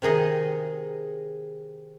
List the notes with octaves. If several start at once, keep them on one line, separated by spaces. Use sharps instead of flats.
C3 D#3 G#4 D#5